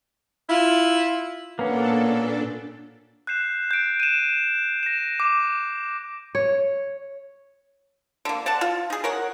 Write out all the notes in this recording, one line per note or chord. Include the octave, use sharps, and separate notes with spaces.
E4 F4
A#2 A#3 B3 C#4 D4 A4
F#6 G6 C7 E7
G6 D7
D#7 E7
A#6 E7
D6
C#5
D3 A#3
D5 F#5 A5
F4
D#4 G#4
A#4 C#5 F#5